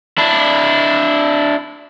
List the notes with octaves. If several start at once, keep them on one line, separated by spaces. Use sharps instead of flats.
D4 E4